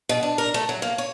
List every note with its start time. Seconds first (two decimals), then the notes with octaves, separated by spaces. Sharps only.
0.09 B2
0.23 D4
0.38 A#4
0.54 A3
0.69 F#3
0.82 A#3
0.98 C#5